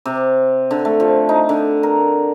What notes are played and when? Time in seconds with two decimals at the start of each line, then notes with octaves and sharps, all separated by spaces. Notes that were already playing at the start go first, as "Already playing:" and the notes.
0.06 C3
0.71 D3
0.85 A3
1.00 F3
1.29 D#4
1.49 D3
1.83 A#4